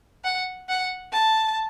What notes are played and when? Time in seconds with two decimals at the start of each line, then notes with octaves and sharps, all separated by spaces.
0.24 F#5
0.69 F#5
1.12 A5